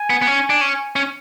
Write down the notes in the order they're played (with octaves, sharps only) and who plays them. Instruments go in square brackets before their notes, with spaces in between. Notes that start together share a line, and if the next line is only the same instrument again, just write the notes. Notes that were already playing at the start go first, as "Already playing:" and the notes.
Already playing: [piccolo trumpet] G#5
[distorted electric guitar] B3
B3
C#4
D4
C#4
C#4